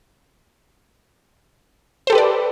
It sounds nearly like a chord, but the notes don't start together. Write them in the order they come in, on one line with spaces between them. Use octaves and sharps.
C5 A4 G4 B4 D5